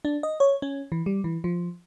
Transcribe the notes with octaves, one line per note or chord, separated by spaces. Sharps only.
D4
D#5
C#5
C#4
E3
G3
E3
F3